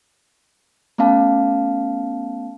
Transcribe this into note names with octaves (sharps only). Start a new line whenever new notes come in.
A3 B3 C#4 F5 A5